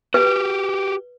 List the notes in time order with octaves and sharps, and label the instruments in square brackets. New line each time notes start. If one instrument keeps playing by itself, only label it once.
[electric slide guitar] F#4 G4 [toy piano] B4